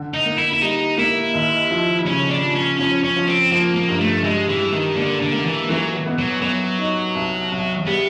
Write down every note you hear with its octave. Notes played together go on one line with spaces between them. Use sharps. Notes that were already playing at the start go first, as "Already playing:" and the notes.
Already playing: D3
D#4
A#3
E4
E4
G3 D#4
A#3 E4
D#2
F3
C#3 C#4
D4
F3
C#4
F3 C#4
C#4
F3
C4
F3 A#3
A#3
G2
A3
G3 G#3
E3
G3
D#3
D3 A#3
D3
A#3
E3
E3 F#3
B3
F#3
F#3 B3
D#4
C2
C2
G3 B3